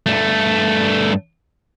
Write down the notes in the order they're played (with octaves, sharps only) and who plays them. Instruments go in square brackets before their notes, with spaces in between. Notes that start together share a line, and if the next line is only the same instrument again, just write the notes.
[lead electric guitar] G2 A3